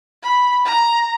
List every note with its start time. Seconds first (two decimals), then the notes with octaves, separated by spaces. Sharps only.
0.23 B5
0.65 A#5